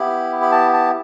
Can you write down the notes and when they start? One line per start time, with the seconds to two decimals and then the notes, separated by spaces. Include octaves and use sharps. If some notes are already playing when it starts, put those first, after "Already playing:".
Already playing: B3 E4 G4 B5
0.42 B5
0.52 A5
0.73 A5